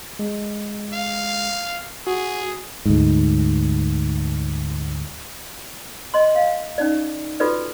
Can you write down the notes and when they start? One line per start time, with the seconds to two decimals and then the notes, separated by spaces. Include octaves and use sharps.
0.19 G#3
0.93 F5
2.07 F#4 G#4
2.85 D2 G#2
6.14 D#5 C6
6.35 F5
6.78 C#4 D#4 D5
7.40 F4 F#4 A4 B4 D5